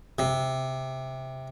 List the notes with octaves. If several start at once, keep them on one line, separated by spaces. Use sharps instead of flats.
C3